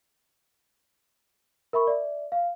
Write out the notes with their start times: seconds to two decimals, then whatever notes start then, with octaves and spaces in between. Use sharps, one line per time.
1.73 A#4 E5 B5 C#6
1.87 D5 E5
2.32 F5